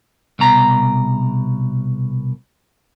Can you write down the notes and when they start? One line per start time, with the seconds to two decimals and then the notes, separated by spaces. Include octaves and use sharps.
0.39 C2 B2 A#5